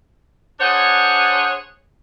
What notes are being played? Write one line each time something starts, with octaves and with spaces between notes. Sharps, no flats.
D4 G#4 C5 C#5 F#5